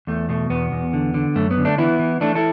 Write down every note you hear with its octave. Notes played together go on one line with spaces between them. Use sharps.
E2 A3
B2 A3
E2 B3
E2
D3
D3
F#2 A3
B3
D3
A3 D4
E3 B3 E4
E3
E3 A3 D4
E4 A4